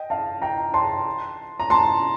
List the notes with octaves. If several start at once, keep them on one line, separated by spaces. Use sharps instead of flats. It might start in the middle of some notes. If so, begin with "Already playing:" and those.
Already playing: D#5 G5
F5 A5
G5 A#5
A5 C6
A#5
A5 C6